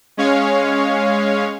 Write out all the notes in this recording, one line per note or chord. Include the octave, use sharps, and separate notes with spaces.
G#3 C#4 C#5 F5